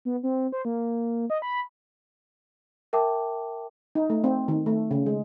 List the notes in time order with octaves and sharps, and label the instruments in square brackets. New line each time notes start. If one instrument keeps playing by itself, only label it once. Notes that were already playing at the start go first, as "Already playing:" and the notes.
[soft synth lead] B3
C4
C5
A#3
D#5
B5
[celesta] A#4 E5 G5 A5 D6
[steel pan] D#4
A3
C4
D#3
A3
C#3
G#3